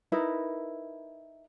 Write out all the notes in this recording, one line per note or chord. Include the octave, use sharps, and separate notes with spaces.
D#4 E4 A#4 B4